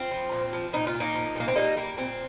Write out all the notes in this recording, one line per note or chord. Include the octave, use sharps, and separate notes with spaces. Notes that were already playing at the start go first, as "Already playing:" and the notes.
Already playing: C4 F4
F3
A#2
F3
A#2 D#4
F4
A#2
A#3 D#4
F3
A#2 A#3
C4
G3 A#3 D#4
G3 A#3
A#2 C4